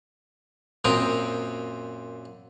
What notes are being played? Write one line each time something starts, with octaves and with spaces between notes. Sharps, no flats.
F#2 A#2 C4 G5 A#5 D#6